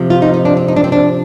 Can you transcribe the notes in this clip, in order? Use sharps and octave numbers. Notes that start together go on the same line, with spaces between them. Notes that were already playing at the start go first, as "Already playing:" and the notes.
Already playing: C3 F3
F4
D#4
D#4
D4
C4
D#4
D4
C4
D4